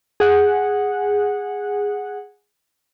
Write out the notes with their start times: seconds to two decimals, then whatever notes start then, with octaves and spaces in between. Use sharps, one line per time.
0.20 G#4 F#5